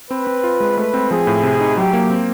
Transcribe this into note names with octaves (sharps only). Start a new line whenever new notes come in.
C4 B4
C4
F4
G#3
A3 B4
C4
F3 G#4
A2
C3
D#4
F#3 G4
A#3
C4